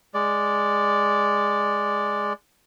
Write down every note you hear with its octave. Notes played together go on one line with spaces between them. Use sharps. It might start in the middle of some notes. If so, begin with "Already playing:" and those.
G#3 D5